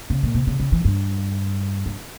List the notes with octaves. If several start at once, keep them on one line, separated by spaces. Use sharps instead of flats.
C#3
A#2
C3
C#3
C#3
E3
G2
G2